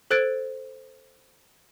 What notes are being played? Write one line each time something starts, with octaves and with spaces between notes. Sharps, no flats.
A4 C5 F#6 G#6 A6 D7